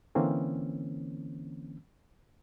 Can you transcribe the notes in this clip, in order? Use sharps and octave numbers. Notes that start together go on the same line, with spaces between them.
D3 E3 A#3 C4 C#4